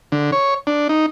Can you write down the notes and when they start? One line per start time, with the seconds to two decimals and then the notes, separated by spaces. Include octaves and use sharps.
0.12 D3
0.32 C#5
0.67 D4
0.89 D#4